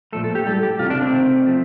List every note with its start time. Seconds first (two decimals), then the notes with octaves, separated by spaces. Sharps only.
0.13 A#2 F3 A3 A4
0.24 A4
0.35 G4
0.46 A2 G3 A4
0.63 G4
0.79 C3 D#3 A3 F4
0.90 D4
1.02 C4
1.13 C3 D#3 A3
1.46 F3 A3